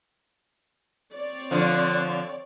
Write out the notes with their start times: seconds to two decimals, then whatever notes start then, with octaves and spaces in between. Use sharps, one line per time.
1.14 C4 C#5 D5
1.51 D3 F3